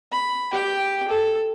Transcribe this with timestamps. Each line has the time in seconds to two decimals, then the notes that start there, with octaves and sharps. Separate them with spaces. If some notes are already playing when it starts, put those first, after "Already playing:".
0.12 B5
0.52 G4 G5
1.09 A4